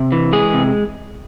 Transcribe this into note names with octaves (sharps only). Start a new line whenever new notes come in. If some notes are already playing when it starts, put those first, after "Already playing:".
Already playing: C3
E3
G#3 G#4
C3